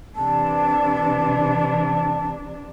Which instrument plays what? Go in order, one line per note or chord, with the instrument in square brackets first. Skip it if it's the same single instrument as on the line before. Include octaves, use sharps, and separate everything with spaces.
[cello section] C3 E3 D4 [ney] A5